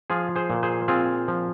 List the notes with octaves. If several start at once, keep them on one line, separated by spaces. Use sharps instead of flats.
F3 F4 G#4
G#4 C5
A#2
G#4 C5
C4 F4 G#4
F3